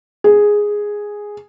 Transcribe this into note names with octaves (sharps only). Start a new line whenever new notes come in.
G#4